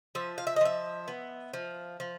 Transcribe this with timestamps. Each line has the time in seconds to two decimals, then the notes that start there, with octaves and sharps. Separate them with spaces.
0.15 F3 E5
0.38 F5
0.47 E5
0.56 D#5
0.61 F3 E5
1.08 B3
1.53 F3
2.00 F3